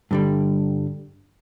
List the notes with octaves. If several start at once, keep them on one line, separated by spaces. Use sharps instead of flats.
G2 D3 G3